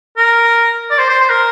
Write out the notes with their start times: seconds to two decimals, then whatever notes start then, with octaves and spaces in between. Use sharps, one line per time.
0.17 A#4
0.90 D5
0.98 C5
1.09 C5
1.20 C5
1.30 A#4